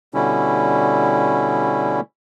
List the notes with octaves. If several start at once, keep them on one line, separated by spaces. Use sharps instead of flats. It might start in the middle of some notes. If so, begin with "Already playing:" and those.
B2 D3 G3 C#4 E4